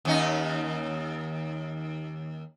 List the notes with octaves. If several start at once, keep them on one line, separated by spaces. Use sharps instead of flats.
D#2 C#4 D#4